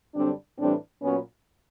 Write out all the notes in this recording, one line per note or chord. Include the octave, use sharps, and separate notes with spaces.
F#2 D3 G3 C4 D4
A2 E3 G3 C4 D4
A#2 F#3 B3 C#4